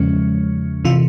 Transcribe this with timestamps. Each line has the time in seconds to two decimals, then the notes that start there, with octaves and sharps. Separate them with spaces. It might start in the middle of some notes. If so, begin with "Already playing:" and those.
Already playing: E2 C#3 F3 G#3 C#4
0.84 C3 E3 F4